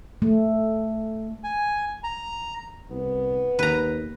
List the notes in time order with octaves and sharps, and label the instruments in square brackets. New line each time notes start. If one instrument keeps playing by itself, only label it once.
[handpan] A3
[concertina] G#5
A#5
[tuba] C2 [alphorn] B3
[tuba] D#2 [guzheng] B4 A#5